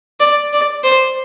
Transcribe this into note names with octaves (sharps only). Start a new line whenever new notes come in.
D5
D5
C5